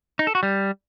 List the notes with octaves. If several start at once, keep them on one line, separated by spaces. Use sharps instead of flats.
D#4
A4
F#4
G3